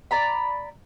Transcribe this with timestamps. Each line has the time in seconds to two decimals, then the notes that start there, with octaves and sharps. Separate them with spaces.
0.11 D5 A#5 B5